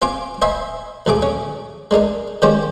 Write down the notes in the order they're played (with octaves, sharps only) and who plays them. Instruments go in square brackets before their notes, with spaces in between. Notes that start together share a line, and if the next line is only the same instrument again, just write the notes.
[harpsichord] C4 F4 G#5 D6
C5 D#5 E5 G#5 B5 C6
D2 F3 A3 G#4 D6
C#4
G#3 D4 D#4 A#4
D#3 F3 G#3 C#4 G4 C5